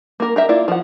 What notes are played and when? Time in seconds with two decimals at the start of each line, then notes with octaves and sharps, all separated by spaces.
0.20 A#3 A#4
0.36 G4 A#4 E5
0.49 A#3 E4 F4 D5
0.68 F3 F#5